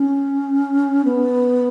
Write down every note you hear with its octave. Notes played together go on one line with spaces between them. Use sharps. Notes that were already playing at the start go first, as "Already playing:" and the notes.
Already playing: C#4
B3